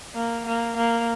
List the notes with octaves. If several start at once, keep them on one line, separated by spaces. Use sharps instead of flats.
A#3
A#3
A#3